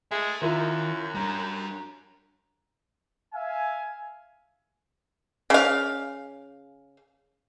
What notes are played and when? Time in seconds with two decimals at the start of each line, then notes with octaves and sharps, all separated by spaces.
0.11 G#3 A4 E5
0.42 F#2 D#3 E4 F4 A#4
1.15 G3 D4 A#5
3.34 E5 F5 G#5
5.50 C#3 F5